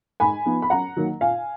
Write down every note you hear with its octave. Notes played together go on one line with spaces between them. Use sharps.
G#2 G#5 B5
F3 B3 D#4
B5
F#2 F#5 A#5
D#3 F#3 A#3 D#4
A#2 F5 G#5